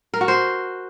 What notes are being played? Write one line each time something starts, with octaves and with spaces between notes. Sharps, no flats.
A#4
F#4
C5